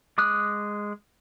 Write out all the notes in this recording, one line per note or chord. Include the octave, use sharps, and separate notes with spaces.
G#3 D6 D#6 F#6